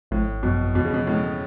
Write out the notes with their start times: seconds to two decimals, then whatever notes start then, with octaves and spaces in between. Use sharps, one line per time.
0.11 G#1 A2
0.43 F#2 B2
0.75 E2 B2
0.85 C#3
0.94 B2
1.07 A2 C#3